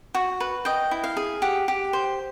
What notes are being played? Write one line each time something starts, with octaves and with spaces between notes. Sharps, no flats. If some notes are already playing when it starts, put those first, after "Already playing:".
F#4
B4
D#5 G5
E4
F5
G#4
G4 F#5
G4
C5